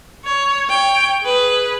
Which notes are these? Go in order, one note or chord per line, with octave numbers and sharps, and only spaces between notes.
C#5
C#5 G5
G#4 B4